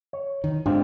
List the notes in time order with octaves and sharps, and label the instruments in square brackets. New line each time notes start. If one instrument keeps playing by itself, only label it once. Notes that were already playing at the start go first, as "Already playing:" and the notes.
[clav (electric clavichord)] C#5
[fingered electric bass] D#3
[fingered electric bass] G#2 [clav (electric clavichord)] C4 F4 G4 [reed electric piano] D4